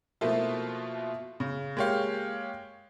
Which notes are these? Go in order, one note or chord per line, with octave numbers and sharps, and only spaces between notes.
B2 F3 A3 A#3 E4 F4
C#3
G#3 A#3 G4 C#5 F5